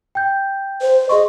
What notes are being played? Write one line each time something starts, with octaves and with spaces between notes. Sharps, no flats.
G5 G6
C5
G#4 D#5 C6 C#6